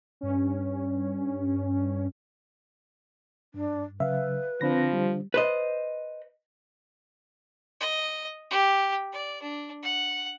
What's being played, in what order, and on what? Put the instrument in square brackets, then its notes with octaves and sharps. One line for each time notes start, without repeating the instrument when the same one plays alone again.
[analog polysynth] G2 C#4
[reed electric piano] G2 [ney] D4
[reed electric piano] C#3 F#3 [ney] B4 [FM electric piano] E5 F5
[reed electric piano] D3 D4 C5 [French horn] F3 [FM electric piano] C4 B5 A#6
[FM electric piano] G3
[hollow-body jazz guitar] B4 C5 D#5
[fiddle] D#5
G4
D5
D4
F#5